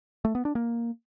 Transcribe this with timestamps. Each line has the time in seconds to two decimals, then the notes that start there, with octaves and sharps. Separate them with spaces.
0.25 A3
0.35 B3
0.45 D4
0.55 A#3